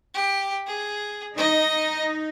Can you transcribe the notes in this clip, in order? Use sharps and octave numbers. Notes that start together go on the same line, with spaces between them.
G4
G#4
D#4 D#5